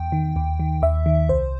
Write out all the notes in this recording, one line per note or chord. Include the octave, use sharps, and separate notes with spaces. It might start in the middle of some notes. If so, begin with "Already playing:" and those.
Already playing: E2 G5
D#3
D#2
D#3
D#2 E5
D#3
C2 C5